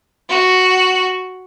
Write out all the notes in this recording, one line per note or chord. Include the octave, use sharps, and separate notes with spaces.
F#4